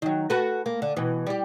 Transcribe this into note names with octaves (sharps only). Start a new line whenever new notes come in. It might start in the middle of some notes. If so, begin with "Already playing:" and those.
D#3 F#3
F#4 A4 B4
A#3
D3
B2 E3
G3 G4